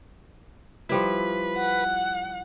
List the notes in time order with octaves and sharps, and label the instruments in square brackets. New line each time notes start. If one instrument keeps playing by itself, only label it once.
[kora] F3 G3 E4 [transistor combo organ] B4
[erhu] F#5